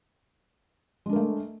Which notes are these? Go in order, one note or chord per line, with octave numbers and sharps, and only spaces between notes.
G#3 A3 D4 A#4